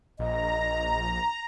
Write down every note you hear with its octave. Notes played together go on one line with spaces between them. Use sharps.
A#1 D#5 A#5